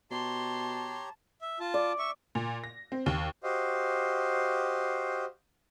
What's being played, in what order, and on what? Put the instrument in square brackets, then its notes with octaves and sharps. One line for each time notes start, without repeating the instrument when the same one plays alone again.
[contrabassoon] B2 [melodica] G4 C#5 A#5 [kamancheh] A5 [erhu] C6
[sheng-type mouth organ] E5
F4 A5
[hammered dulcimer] D5
[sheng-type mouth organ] E5 C#6
[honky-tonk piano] A#2
A#6
C4
D#2
[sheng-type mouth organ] F#4 G4 C5 D#5 F5